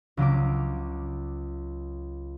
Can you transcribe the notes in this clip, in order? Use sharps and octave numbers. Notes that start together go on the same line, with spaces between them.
C#2 F#3 C#4 D6